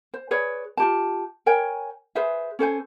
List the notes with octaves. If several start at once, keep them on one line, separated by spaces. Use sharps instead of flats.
C5
G#4 B4 C#5 D5
F4 G4 A5
A#4 C#5 G5 G#5
G#4 B4 C5 E5
C#4 A4 C5 G#5